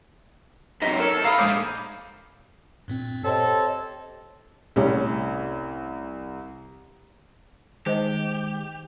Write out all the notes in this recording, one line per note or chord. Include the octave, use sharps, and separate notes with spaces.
F#2 C3 D#4
A4 A#4 C#5
A4 F5 A#5 B5 D#6
A#1 G#3 G#4 C5 D6
G2 A#2 C4
C4 G4 A4 C#5 D#5
C2 A2 G3 C#4
D#3 G#3 G4 C5 D#5 A5